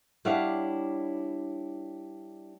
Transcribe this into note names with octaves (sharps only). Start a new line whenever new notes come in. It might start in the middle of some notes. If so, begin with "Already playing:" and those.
G3 D4 E4 C#5 F5 F#5